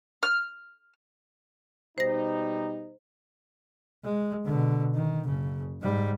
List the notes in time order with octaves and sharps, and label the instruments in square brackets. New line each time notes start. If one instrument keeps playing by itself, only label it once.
[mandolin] F6
[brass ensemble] B2 G3 D#4 [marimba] C5 A#6
[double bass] G#3
B2 D3
D#3
F#1 C#3
G#2 G3